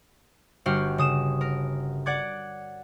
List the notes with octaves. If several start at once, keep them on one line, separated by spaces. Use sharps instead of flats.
G1 F#4 G4 F5 F6
C#3 D#6 E7
A#4
D5 F#5 D6 G#6